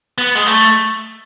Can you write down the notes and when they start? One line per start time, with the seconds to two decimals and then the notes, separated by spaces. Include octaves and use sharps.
0.18 B3
0.35 G#3
0.47 A3